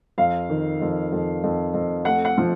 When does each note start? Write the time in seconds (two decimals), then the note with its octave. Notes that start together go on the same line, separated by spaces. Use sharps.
0.18 F2 F5
0.49 D#3
0.81 F2
1.12 F2
1.44 F2
1.74 F2
2.05 A3 F#5
2.25 F#5
2.38 F3